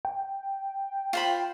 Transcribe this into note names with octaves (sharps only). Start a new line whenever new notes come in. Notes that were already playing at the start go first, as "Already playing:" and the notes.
G5
F4 C5 B5